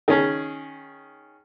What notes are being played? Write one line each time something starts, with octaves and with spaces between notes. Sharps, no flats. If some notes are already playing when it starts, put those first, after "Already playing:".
D#3 C#4 G#4